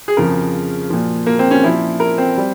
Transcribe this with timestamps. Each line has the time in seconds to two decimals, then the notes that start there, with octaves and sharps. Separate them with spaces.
0.08 G#4
0.17 F2 C#3 F3 A#4
0.90 A#2 F3
1.27 A#3
1.39 C4
1.51 C#4
1.64 A#2 F3 E4
2.00 A#4
2.18 C4
2.37 G3